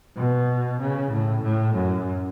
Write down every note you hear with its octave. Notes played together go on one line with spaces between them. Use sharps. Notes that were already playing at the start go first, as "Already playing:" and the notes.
B2
C#3
A2
A2
F#2